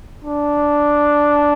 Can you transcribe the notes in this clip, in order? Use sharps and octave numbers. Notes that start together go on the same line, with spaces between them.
D4